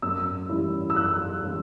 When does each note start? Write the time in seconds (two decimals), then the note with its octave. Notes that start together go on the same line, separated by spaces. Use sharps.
0.02 F#2 E6
0.49 E3 G3 C#4 E4
0.90 E6
0.96 F#2 F#6
1.43 E3 G3 C#4 E4